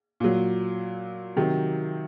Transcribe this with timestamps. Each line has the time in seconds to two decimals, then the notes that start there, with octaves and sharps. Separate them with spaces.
0.20 A#2 F#3
1.36 C3 D#3 F#3